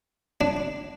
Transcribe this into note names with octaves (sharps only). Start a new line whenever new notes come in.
D4